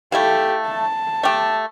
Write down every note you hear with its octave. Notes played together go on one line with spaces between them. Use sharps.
A3 E4 G4 A4 F5
A5
A3 G4